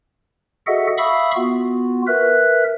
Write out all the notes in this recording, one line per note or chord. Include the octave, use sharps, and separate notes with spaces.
F#4 G#4 A4 D#5 E5 F#5
E5 F5 B5 C#6 D#6 E6
B3 F4 F#4
A#4 B4 E5 F#6